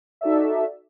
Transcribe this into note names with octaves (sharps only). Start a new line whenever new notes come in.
D#4 F#4 A4 D5 E5